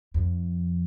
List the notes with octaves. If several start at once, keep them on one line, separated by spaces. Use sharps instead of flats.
F2